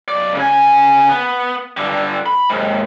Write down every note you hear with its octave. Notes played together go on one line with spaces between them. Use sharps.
B1 D5
C#3 G#5
B3
G2 D3
B5
D#2 G#2